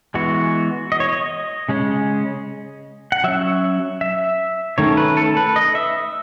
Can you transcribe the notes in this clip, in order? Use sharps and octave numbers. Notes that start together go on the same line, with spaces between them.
E3 G#3 B3 F#4
D#5
C#5
D#5
C#3 G#3 C#4
F#5
F#3 C#4 E5
E5
D#3 A3 C#4 C#5
B4
A4
B4
D#5
E5